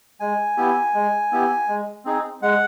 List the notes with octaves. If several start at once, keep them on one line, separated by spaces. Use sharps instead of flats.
G#3 G#5
B3 E4 G4
G#3
B3 E4 G4
G#3
C4 D#4 G#4
G#3 F#5